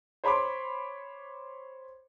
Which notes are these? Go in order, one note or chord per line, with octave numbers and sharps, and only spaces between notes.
C5 C#5 B5 C6 D6